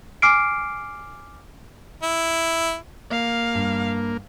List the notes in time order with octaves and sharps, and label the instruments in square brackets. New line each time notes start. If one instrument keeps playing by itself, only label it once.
[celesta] G#5 D6 F6 C7 D7
[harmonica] E4
[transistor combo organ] A#3 [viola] F5
[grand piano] G2